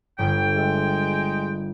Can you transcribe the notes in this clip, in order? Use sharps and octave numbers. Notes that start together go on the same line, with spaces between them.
G1 G3 G5
G#3 E5